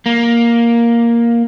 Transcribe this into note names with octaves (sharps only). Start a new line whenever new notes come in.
A#3